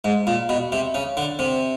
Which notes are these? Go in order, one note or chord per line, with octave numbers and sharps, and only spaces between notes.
G#2
A#2
B2
C3
C#3
D3
C3